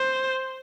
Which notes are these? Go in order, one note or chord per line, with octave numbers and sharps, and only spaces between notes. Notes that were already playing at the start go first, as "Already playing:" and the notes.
Already playing: C5